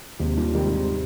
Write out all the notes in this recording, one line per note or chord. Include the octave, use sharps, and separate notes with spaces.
D#2 G#2 C3
G2 A#2
G#2 C3 D#3 G3
G#2 C3
C3